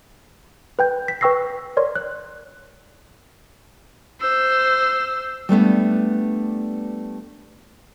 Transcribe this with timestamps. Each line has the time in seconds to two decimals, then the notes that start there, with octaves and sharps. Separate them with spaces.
0.79 B4 G5 G6
1.08 B6
1.21 B4 G5 C#6 E6 A#6 C7
1.77 A#4 C#5 D5 C6
1.96 F#6
4.20 C5 E6
5.49 G3 A3 B3 D4